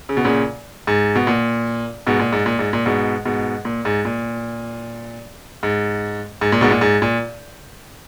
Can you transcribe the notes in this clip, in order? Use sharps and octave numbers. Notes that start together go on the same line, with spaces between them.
C#3
B2
A#2 C#3
G#2
B2
A#2
G#2 B2
A#2
G#2
A#2
G#2
A#2
G#2 B2
G#2 B2
A#2
G#2
A#2
G#2
G#2
A#2
G#2 B2
A#2
G#2
A#2